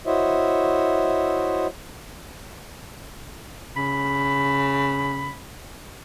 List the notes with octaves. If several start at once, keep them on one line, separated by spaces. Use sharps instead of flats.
E4 F#4 C5 C#5 D#5 E5
C#3 B5